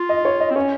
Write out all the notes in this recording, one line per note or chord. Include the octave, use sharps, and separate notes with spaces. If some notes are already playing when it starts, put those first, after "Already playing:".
Already playing: F4
D#5
C#5
D#5
C4
C#4 C#5